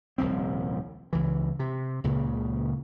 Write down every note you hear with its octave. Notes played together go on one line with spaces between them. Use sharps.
D#1 C2 F3 C4
C#2 E3
C3
C#2 A#2 C#3